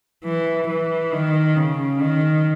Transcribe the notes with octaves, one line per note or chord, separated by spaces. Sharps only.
E3
E3
D#3
C#3
D#3